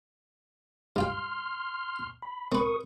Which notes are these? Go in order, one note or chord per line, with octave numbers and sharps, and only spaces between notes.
G2 F4 G5 C6 F6
B5
C4 A#4 B4 C#6 D#6